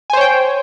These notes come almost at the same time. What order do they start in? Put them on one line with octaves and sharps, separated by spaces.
G#5 C5 C#5 G5